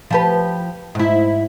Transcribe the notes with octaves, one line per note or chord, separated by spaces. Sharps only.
F3 G4 B4
G#2 E4